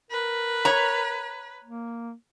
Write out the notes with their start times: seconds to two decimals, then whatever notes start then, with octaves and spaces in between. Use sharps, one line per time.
0.11 A#4 B4
0.65 C#5 A#5
1.64 A#3